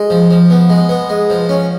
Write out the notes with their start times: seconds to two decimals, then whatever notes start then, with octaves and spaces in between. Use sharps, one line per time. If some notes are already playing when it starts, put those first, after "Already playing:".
Already playing: G#3
0.10 F3
0.30 F3
0.50 B3
0.70 G#3
0.89 B3
1.09 G#3
1.30 F3
1.49 C#4